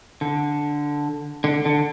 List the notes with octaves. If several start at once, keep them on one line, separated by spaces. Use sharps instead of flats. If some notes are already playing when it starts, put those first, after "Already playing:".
D3
D3
D3